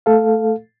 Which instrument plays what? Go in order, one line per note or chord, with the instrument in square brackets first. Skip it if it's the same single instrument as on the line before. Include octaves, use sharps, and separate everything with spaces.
[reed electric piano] A3 A4 F5